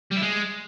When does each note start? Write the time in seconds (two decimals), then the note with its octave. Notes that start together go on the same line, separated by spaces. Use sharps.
0.11 G3
0.16 E4
0.22 G#3